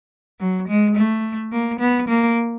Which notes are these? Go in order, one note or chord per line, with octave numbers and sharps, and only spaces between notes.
F#3
G#3
A3
A#3
B3
A#3